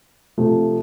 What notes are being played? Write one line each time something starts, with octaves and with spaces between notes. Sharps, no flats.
C3 F3 A3